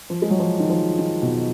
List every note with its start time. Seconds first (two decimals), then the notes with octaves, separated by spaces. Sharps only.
0.10 F3
0.22 G#3
0.30 F#3
0.39 F3
0.60 D#3
0.70 F3
0.99 D#3
1.22 B2